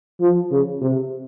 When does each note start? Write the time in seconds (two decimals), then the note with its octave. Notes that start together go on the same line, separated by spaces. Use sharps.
0.21 F3
0.51 C#3
0.81 C3